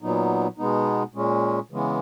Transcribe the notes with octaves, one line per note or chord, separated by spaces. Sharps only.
A#2 F#3 B3 D#4
B2 G#3 B3 D#4
A#2 G#3 C#4
C#3 E3 G#3 B3